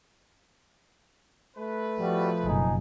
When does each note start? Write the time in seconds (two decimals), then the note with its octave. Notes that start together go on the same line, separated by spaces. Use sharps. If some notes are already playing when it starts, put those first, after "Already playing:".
1.56 A3 B4
2.00 B2 F3 G3 F#4
2.45 F#1 B2 D#4 G#4